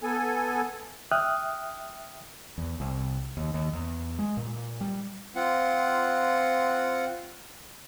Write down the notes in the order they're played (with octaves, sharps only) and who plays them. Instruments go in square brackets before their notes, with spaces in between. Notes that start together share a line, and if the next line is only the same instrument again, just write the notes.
[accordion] B3 A4 G#5
[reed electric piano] E5 G5 D#6 F6 F#6
[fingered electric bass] E2
C2
D#2
D#2
E2
G#3
A#2
G3
[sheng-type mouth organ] C4 F4 F#5